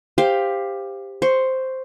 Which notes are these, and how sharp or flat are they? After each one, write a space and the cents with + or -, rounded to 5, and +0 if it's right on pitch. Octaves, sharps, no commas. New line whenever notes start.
G4 +15 C5 +0 F5 +0
C5 +0 C#6 +0